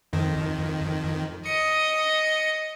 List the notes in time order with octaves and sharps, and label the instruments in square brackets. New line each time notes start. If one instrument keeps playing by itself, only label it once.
[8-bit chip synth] F2 D#3
[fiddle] D#5 [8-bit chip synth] C#7